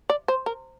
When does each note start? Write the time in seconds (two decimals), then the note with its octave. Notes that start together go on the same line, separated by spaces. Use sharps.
0.10 D5
0.28 C5
0.46 A#4